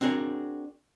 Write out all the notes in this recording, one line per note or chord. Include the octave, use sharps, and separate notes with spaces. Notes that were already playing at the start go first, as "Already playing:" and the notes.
C4 D4 F#4 G#4 A#4 C#5